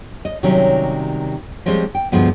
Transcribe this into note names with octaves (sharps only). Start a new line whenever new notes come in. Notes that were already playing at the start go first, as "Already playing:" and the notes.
D#5
C3 D#3 F#3 G3 C#4
F3 G3 G#3 C4 C#4
G5
D2 G2 B2 F3 G#3 B3